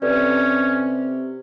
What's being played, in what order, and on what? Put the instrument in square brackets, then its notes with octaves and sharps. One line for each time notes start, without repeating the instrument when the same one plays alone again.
[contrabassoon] C3 [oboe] C#4 [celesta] A4 B4 D5